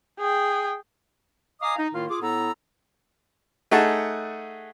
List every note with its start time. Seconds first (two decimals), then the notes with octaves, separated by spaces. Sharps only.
0.19 G#4 G5
1.62 D#5 F5 G#5 A#5 D6 D#6
1.78 D#4
1.94 A2 D#3 A#3 F4
2.09 F4 G#4 D6
2.22 A2 B3 E4 A4 A#5 E6
3.71 A3 D#4 G#4 F#5 A5